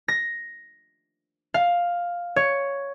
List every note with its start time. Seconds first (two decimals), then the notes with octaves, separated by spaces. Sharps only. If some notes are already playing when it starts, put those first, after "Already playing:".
0.08 A#6
1.54 F5
2.36 C#5